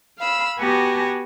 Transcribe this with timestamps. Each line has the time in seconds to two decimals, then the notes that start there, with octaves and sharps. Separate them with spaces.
0.19 F5 B5 E6
0.59 B3 F#4 G4 G#5 A5 A#6